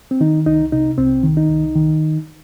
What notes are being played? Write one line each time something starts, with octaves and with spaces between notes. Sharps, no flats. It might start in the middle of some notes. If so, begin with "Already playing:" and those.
C4
D#3 D#4
C2 D#4
C3 D#4
C2 C4
D#3
D#4
C2
D#3